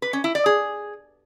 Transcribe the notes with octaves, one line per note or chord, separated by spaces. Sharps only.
B4
C#4
E4
D5
G#4